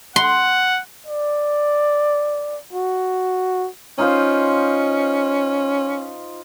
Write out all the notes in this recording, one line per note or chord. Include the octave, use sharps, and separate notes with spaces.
F#5 C6
D5
F#4
C#4 D#4 F4 C5